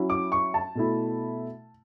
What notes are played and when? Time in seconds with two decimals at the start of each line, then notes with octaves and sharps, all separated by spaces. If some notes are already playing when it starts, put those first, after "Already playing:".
Already playing: F#3 C#4 E4
0.10 D6
0.32 C#6
0.54 A5
0.75 B2 A3 E4